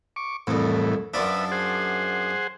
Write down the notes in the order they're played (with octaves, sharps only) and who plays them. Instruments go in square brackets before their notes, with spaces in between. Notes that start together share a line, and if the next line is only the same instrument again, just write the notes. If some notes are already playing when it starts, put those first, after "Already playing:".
[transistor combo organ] C#6 D6
[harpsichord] C2 F2 [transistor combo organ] A2 E3
[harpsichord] F#2 F3 D4 [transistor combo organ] B4 E5
[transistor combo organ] G#4 C5 F#5